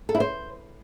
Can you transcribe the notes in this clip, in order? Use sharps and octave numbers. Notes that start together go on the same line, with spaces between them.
A4
E4
C5